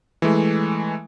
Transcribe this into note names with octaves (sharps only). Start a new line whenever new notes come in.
E3 G#3 A3